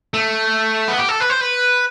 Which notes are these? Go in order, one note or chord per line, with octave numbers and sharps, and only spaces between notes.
A3
B3
G4
A4
B4
C5
B4